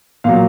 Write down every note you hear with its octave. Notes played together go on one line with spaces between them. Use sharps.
A#2 F#3 F5